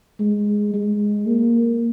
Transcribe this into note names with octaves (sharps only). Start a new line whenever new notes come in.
G#3
G#3
A#3